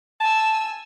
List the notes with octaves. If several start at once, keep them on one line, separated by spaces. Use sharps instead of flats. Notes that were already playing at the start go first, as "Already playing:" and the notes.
G#5 A5 E6